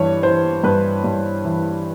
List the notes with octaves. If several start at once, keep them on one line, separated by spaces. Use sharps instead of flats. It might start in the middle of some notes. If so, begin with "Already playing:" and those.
Already playing: G2 E3 C#5
E3 C5
G2 B4
G2
E3